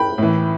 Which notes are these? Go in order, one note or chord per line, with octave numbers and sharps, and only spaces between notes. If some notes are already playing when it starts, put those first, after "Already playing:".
Already playing: G5 B5
A2 E3